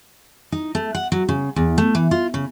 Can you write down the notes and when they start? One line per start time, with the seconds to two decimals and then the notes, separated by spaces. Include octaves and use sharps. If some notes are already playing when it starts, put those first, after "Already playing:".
0.52 D#4
0.75 A3
0.95 F#5
1.12 F#3
1.29 C#3
1.56 E2
1.78 A3
1.95 E3
2.11 F4
2.34 C#3